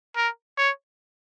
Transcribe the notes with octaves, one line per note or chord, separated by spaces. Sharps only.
A#4
C#5